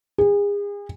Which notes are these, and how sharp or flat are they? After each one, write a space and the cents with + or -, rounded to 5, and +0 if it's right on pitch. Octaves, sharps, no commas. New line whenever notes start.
G#4 -35